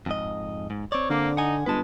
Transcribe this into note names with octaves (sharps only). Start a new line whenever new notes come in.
F2 G#2 D#5
G#2
C4 C#5 D5
D3 A#3
D#4 F#5 G#5
G1 G#3 B4 A5